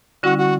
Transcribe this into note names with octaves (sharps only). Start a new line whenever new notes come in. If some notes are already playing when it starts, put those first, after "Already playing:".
D3 G3 C#4 E4 F#4
F#4